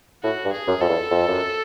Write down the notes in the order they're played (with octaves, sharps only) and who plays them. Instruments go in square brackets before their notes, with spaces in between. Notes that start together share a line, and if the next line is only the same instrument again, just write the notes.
[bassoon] A2 [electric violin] F#4
[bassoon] G2
[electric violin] G#4
[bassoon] F#2
[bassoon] F2 [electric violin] A4
[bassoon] E2
F2
F#2